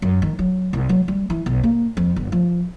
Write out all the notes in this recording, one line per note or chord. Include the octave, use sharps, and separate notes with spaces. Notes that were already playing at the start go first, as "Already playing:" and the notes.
F#2
D#3
F#3
C2
F#3
G3
E3
B1
A#3
F2
G1
F3